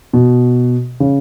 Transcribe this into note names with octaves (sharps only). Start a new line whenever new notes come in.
B2
C#3